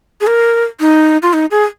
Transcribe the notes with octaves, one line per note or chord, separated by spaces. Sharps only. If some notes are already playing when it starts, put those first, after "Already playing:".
G#4
A#4
D#4
F4
D#4
G#4